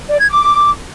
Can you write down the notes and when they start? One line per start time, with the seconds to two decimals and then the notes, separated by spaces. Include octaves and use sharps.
0.08 D5
0.19 G#6
0.29 D6